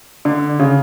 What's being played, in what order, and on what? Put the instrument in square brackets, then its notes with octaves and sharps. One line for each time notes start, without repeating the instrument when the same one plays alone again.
[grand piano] D3
C#3